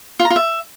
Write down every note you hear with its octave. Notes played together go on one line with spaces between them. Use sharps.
F4
A#5
F4
E5